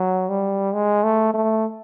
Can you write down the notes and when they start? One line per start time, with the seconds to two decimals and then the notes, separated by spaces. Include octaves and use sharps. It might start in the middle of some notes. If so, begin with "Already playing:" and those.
Already playing: F#3
0.29 G3
0.74 G#3
1.04 A3
1.34 A3